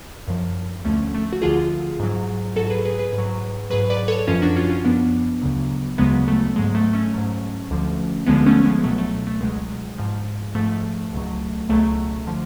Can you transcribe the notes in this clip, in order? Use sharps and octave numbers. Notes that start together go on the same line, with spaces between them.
F#2 F3
D2 D3 F3 A3 C#4
A3
F#4
D2 D3 F3 F4 G#4
G#2 F#3
G#2 F#3 F#4 A4
G#4 B4
G#4 B4
G#4 B4
G#2
F#3
G#2 F#3 G#4 B4
B4 D5
A4 C#5
F#2 F3 C#4 F4
D4 F#4
C#4 F4
C#4 F4
F#2 F3 B3 D4
D2 C#3 F#3
D2 C#3 F#3 G#3 B3
A3
G#2 F#3 G#3
A3
A3 C#4
G#2 F#3
D2 D3 F3
D2 D3 F3 G#3 B3
A3 C#4
G#3 B3
C#2 B2 F#3 A3
A3
A3
C#2 B2 F#3 G#3
G#2 F3
G#2 F3 A3
C#2 B2 F#3
C#2 B2 F#3 A3
D3 F3